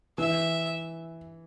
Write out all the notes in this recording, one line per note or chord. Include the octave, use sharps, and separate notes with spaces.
E3 E5